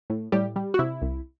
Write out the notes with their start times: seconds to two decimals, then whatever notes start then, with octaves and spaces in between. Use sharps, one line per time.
0.10 A2
0.32 A2 G3 G4
0.56 G3
0.74 F#4
0.79 C3 E4
1.02 C2